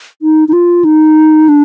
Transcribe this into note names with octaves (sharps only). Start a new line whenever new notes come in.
D#4
D#4
F4
D#4
D4